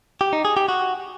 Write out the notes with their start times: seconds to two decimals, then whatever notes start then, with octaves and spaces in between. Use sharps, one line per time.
0.21 G4
0.33 D#4
0.45 G#4
0.57 G4
0.68 F#4